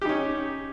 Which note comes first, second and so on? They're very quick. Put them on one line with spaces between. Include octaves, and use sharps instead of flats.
G4 D#4 C#4